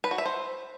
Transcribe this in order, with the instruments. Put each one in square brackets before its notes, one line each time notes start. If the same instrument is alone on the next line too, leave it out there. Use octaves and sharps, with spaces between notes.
[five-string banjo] B4
F#4
E5
C5